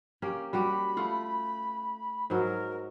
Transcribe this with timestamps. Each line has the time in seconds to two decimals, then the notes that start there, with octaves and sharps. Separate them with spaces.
0.22 A#3 C#4 G4
0.53 G3 F#4 G4 B5
0.97 A3 F4 F#5
2.30 G#2 F#3 A#4